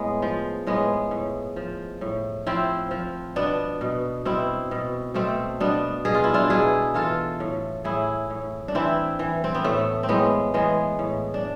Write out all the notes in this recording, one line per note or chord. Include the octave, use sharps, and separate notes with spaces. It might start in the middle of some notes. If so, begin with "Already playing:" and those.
Already playing: A2 G#3 B3
F3
A2 G#3 B3
A2
F3
A2
F3 C4 E4
F3
B2 B3 D4
B2
B2 C4 E4
B2
B2 A3 C4
B2 B3 D4
B2 G#4
F4
E4
D4 F4
B2 E4 G#4
E3 F4 A4
A2
A2 E4 G#4
A2
D4
E3 C4 E4
E3
C4
B3
A2 A3
C4
A2 G#3 B3
E3 G#3 B3
A2
D4